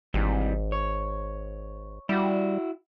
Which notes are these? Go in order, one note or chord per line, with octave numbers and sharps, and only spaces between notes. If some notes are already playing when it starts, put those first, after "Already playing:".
G#1 G2 C3 G3
C#5
G3 E4 F#4